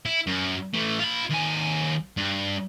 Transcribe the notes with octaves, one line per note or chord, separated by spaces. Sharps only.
E4
F#2
E3 A3
F4 B5
D#2 G#5
G2